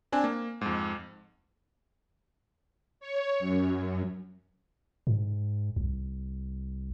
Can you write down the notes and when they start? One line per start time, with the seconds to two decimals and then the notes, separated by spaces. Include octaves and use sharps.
0.12 C4 D4 G#5
0.24 A#3
0.61 F2 G#2
3.00 C#5
3.39 F#2
5.07 G#2
5.76 C2